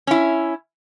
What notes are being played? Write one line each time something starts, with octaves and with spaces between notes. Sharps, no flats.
C#4 E4